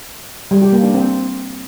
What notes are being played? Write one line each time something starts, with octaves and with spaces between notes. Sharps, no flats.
G3
G4
A#3
D4
C4